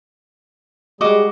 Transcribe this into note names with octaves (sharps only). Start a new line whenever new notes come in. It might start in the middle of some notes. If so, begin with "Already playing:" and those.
G3 G#3 F#4 G#4 D#5 D6